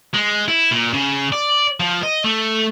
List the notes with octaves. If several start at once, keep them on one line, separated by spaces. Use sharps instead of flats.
G#3
E4
A#2
C#3
D5
F3
D#5
A3